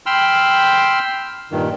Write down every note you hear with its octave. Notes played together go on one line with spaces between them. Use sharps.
G5 B5 C6 E6 F6
G2 A#2 D#3